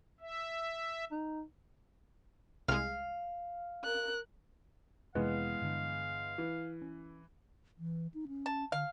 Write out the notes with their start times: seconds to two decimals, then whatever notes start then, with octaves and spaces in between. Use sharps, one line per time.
0.20 E5
1.11 D#4
2.68 C2 G#3 F5
3.84 A#4 F#6
5.15 F1 C3 E3 G#3 A#3 B3 F5
5.61 G2 D3 D4
6.38 E3
6.82 C#4
7.79 E3
8.14 D#4
8.28 C#4
8.46 A5
8.72 D3 F5